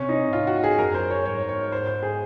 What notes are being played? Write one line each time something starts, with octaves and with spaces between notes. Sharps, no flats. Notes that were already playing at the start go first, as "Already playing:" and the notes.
Already playing: C3 C#4
D#4
G#2 F4
F#4
G#4
F#2 A#4
C5
C#5
G#2 C#5
C#5
C5
C5
G#4